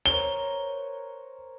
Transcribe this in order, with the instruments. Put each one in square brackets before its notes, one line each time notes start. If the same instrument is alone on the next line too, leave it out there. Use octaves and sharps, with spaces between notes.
[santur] A#4 C5 C#5 [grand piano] G7